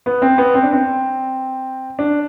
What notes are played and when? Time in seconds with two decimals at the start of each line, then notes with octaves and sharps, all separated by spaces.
0.06 B3
0.22 C4
0.38 B3
0.54 C4
0.63 D4
0.73 C4
1.99 D4